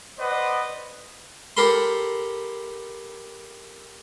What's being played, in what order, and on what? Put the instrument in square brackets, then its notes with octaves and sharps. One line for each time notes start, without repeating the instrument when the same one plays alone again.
[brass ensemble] B4 C5 D5 D#5 F#5
[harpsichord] G4 A4 A#4 B5 C6